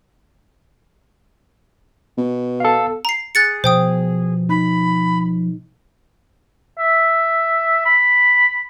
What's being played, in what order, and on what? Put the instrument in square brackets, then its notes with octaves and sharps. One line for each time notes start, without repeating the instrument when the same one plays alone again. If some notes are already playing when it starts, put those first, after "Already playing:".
[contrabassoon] B2
[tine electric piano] A4 F5
[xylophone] A#5 C7
[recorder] G#4 [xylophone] F#6 A6 C#7
[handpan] B2 [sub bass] F3 [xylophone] C5 G5 D#6
[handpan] D#4 [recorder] B5
[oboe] E5
B5